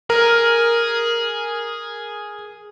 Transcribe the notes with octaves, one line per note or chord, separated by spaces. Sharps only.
G#4 A#4